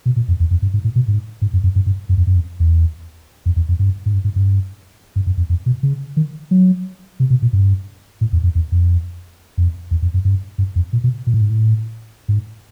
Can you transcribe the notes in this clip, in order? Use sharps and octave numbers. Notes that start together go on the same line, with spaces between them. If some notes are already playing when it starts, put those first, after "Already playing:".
B2
A#2
F2
E2
F2
G2
G#2
A2
B2
G#2
G#2
F#2
F#2
G2
G2
F#2
F2
F#2
F2
E2
F2
E2
F2
G2
G#2
G2
G#2
G2
G2
F#2
F2
F2
B2
C#3
D#3
F#3
C3
B2
A#2
G2
A2
E2
F2
E2
F2
F2
E2
F2
F#2
G2
G2
F2
A#2
B2
A#2
A2
G#2
A2
G#2